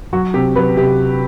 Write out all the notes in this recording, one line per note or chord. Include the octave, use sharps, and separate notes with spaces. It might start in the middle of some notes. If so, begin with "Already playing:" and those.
F#3 F#4
C3 G4
F#3 B4
C3 G4